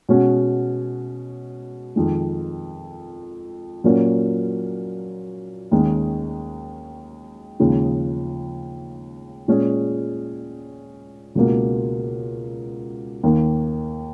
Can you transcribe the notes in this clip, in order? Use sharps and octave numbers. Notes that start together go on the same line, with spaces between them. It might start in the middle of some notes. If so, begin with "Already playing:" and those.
B2 G#3 C#4 F#4
F2 D#3 G#3
A#2 F#3 A#3 C#4
D#2 D#3 G#3 C#4
D#2 C#3 F3 G#3 D#4
A#2 G#3 C#4 G#4
C#2 B2 A#3
D#2 D#3 A#3